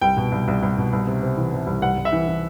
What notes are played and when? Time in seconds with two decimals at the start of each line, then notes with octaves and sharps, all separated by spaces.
0.01 C2 G5
0.17 B2
0.32 C2
0.48 C2
0.63 C2
0.77 B2
0.93 C2
1.07 C3
1.22 C3
1.37 E3
1.53 C3
1.67 C2
1.82 C2 F#5
1.97 C2
2.05 E5
2.12 E3
2.27 E3